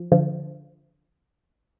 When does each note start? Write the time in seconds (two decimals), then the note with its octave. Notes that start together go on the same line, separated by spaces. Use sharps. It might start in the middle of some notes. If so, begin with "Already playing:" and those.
Already playing: F3
0.12 D3 F3